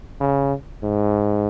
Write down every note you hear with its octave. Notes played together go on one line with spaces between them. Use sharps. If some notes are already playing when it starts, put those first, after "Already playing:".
C#3
G#2